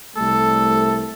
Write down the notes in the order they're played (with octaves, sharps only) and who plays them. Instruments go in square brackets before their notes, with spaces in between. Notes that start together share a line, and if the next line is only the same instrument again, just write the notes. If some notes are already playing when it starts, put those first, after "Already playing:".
[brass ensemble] C2 G3 A3 [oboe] A4